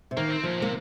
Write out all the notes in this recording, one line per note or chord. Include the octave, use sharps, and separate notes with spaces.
C3
D#3 A#3
C4
A#2 F3
C3
A#3